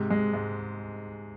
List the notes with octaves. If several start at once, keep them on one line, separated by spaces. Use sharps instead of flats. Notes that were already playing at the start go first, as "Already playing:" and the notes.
Already playing: G#2 C3
G#3
G#2